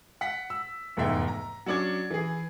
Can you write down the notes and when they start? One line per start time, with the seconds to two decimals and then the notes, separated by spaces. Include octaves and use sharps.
0.21 F#5 B6
0.50 E6
0.97 F1 E2 G#2 G#3 E5 G5
1.28 A#5
1.66 F#3 C#4 D4 D6 G#6
2.10 E3 G#4